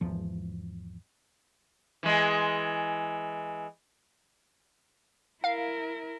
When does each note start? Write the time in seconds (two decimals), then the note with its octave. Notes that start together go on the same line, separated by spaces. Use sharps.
0.01 G#1 E2 F3
2.03 E3 G#3
5.44 E4 A#4 F5